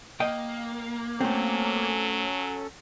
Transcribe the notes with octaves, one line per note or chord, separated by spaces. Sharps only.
A#3 D#5 G5
F#3 A3 C4 C#4 A4